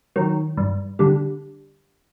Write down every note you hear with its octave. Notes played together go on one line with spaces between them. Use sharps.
D#3 F#3
G2
D3 G3